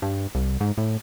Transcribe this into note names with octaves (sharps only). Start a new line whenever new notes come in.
G2
C2
G#2
A2